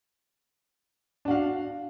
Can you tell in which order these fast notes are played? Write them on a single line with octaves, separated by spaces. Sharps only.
D4 F#4 F5